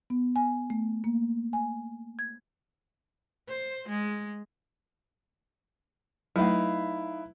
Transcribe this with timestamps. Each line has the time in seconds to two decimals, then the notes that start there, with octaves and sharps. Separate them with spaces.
0.10 B3
0.36 G#5
0.70 A3
1.04 A#3
1.53 G#5
2.19 G#6
3.49 C5
3.89 G#3
6.36 F#3 A3 D#4 E4 B4 F5